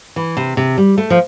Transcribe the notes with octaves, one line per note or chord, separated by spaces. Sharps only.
E3
C3
C3
G3
A3
F3